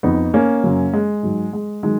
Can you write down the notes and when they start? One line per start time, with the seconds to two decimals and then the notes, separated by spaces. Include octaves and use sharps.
0.03 F2 F3 B3 D#4
0.34 A#3 C#4
0.64 F#2 C#3 F#3
0.93 G#3
1.23 G#2 F#3
1.53 G#3
1.83 D#3 F#3 G#3